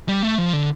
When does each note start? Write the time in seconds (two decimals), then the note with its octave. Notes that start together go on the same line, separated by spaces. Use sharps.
0.08 G3
0.23 A3
0.38 F3
0.53 D3